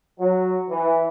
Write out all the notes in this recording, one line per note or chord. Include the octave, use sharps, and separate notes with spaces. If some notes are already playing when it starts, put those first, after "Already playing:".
F#3
E3